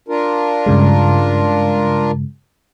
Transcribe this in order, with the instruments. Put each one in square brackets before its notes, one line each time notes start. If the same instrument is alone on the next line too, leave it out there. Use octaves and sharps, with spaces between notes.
[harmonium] D4 F4 A#4
[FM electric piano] G2 C#3 G#3